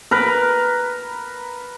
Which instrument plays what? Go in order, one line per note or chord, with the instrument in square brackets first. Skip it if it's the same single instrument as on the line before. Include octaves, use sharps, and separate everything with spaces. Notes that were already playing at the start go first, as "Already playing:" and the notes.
[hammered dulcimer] A#4 B4